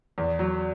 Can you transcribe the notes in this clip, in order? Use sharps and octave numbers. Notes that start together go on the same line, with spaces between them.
E2
F#3